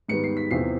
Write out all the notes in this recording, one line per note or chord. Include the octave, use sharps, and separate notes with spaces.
G#2 D#3 G3 B3 C#7
C7
B6
E2 C3 F3 C7